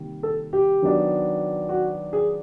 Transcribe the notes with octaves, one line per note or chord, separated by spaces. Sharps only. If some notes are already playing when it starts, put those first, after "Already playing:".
Already playing: C3 D#3 G3 A#3
A4
G4
D#3 F#3 B3 D4
F#4
G#4